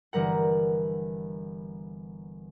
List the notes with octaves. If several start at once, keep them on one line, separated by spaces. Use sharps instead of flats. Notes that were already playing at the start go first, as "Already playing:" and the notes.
G1 E3 G3 A#4 F#5